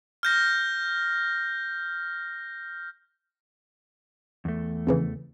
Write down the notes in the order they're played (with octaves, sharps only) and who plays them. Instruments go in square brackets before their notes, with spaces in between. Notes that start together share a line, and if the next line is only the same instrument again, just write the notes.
[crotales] F6 G6 A#6
[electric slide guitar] E2 A3
[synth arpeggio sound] F2 C#3 E3